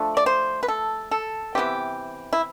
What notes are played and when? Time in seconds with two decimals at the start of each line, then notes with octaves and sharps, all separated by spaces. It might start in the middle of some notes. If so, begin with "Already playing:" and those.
Already playing: F3 A3 D4
0.17 D5
0.26 C5
0.63 B4
0.68 A4
1.11 A4
1.55 C3 E3 B3 G4
2.33 E4